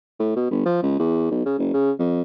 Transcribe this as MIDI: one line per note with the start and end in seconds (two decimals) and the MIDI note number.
0.19 0.31 45
0.36 0.51 47
0.51 0.60 31
0.65 0.79 53
0.83 0.95 37
0.99 1.29 40
1.31 1.43 35
1.46 1.56 49
1.58 1.73 30
1.74 1.91 49
1.99 2.22 41